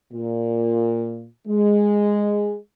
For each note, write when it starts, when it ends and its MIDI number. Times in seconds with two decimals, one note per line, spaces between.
0.13 1.26 46
1.48 2.56 56